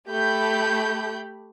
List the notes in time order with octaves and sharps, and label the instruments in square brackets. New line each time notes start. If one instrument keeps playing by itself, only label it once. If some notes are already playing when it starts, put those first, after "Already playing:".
[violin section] A3 G4 B5 G6